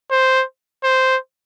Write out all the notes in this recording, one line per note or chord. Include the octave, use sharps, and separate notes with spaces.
C5
C5